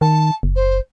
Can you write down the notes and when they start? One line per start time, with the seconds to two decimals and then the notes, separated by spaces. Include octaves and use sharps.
0.01 D#3 A5
0.43 F#1
0.55 C5